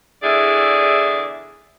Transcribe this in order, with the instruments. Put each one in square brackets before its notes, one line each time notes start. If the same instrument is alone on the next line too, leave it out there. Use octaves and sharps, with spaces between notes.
[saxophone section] E2 D3 E4 G#4 D5